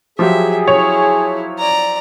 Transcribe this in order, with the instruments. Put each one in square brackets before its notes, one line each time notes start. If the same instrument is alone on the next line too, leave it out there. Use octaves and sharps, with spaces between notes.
[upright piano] F3 F#3 G4 [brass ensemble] G#4 [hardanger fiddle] E5
[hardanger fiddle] E4 [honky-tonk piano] C#5
[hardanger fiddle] D5 A#5